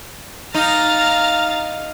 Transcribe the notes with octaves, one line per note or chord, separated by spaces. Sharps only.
D#4 F5 A#5 F6 A6